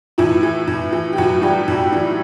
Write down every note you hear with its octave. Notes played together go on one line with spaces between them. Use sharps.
A2 E3 E4
E3
A2
E3
G4
A2 F#3 F#4
E3 G3 G4
A2
E3